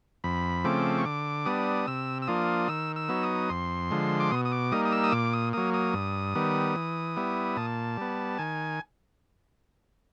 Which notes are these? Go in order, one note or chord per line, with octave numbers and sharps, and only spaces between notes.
F2 B5
C#3 F3 A3 C4 D6
C#6
D3 D6
G3 B3 D4 D#6
C3 E6
E6
F3 A#3 D4 F4 D#6
D#3 E6
E6
F#3 B3 D#4
D#6
F2 C6
D3 F3 G#3
D6
B2 D#6
D#6
D6
G3 A#3 D#4 D#6
D#6
E6
D#6
A#2 D6
D#6
F#3 A#3 D#6
D#6
G2
D#3 G3 B3
E3
G3 B3 E4
A#2 A5
G3 B3
D#3 G#5